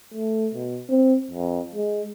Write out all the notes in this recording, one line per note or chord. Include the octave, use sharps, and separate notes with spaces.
A3
B2
C4
F2
G#3